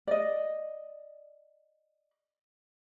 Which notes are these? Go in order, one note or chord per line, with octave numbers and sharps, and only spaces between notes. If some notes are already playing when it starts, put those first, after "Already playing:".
D5 D#5